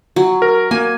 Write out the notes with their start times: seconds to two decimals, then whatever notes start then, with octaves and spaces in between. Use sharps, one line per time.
0.16 F#3
0.42 A#4
0.71 A#3 G#5